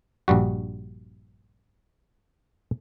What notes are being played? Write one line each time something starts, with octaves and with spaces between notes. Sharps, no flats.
A#1 G2 G3 F#4